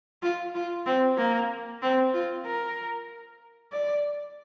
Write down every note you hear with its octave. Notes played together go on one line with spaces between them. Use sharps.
F4
F4
C4
A#3
C4
F4
A#4
D5